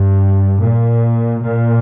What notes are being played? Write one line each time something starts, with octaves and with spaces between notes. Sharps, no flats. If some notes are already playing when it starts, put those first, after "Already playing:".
Already playing: G2
A#2
A#2